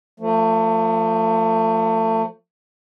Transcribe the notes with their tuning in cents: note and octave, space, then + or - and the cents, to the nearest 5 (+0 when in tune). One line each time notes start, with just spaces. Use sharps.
F3 +0 A3 +30